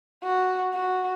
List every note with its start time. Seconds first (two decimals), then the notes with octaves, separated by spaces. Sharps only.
0.24 F#4
0.74 F#4